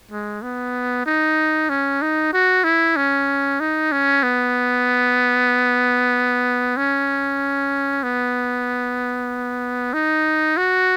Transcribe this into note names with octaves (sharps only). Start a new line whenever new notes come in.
G#3
B3
D#4
C#4
D#4
F#4
E4
C#4
D#4
C#4
B3
C#4
B3
D#4
F#4